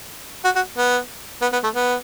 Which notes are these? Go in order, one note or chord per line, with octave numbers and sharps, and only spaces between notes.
F#4
F#4
B3
B3
B3
A3
B3